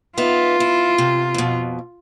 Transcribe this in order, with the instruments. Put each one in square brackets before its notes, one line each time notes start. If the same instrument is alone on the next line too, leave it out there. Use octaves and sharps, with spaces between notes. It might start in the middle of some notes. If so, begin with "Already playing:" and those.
[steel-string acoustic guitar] B3 D#4 E5 [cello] F4
[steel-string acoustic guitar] E4
C3
F2 B2